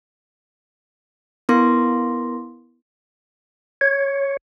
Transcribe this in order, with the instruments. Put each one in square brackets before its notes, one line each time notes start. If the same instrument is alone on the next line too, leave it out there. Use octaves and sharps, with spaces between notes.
[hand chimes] B3 E4 A#4 C6 D6 A#6
[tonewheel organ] C#5